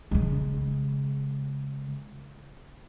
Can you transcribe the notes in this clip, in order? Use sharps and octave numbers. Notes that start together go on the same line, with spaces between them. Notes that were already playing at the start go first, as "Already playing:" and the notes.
C#3 G#3